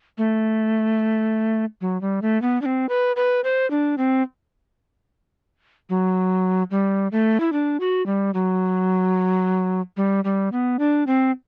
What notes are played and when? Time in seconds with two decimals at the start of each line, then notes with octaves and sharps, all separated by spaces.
0.18 A3
1.81 F#3
2.01 G3
2.22 A3
2.42 B3
2.62 D4
2.66 C4
2.89 B4
3.16 B4
3.44 C5
3.71 D4
3.98 C4
5.90 F#3
6.71 G3
7.12 A3
7.40 E4
7.53 D4
7.80 F#4
8.06 G3
8.34 F#3
9.97 G3
10.24 G3
10.52 B3
10.79 D4
11.07 C4